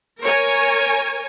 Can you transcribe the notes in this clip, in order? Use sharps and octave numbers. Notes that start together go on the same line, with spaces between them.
A#4 C#5 G#5